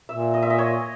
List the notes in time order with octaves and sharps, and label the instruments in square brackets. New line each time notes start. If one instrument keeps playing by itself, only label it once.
[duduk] A#2 [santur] E5
[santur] D#5
E5
D#5
C#5